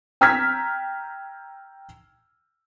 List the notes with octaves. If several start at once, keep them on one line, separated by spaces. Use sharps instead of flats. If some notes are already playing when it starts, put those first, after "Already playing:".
G5 A#5 E6 F6 G#6 B6